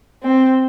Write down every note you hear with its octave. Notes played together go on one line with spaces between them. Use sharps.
C4